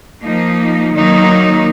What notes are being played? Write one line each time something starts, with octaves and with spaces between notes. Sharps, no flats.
F3 A#3 D#4
D#3 F#3 A#3 D#4